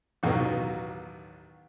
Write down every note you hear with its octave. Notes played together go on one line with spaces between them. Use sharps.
A1 D#2 B2 F#3 B3 D#4